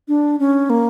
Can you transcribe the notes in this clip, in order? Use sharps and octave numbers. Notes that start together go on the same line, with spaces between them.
D4
C#4
A#3